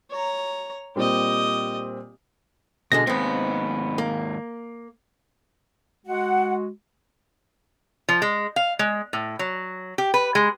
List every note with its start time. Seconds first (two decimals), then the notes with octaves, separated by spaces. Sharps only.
0.11 C#5 A#5
0.96 A#2 G3 C4 G4 D#5
2.92 B2 D3 G#3 A#6
3.07 D#2 G#2 B3 C4
3.98 A#3
6.06 G#3 F#4 F#5
8.09 F3
8.22 G#3
8.56 F5
8.79 G#3
9.13 A2
9.39 F#3
9.98 G4
10.14 B4
10.35 G#3